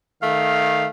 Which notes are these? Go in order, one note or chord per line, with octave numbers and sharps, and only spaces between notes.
D#3 A3 F5